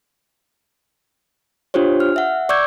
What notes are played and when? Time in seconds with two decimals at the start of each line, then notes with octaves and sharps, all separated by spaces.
1.74 D4 F4 G4 C5 C#5
2.00 F6
2.16 E5 F#5
2.49 D5 C#6 D6 E6 G6 G#6